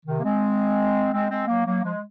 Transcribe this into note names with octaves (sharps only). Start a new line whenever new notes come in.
C3 D#3
A#3
G#3 C4
G#3 C4
G#3 C4
F#3 A#3
F#3 A#3
F3 G#3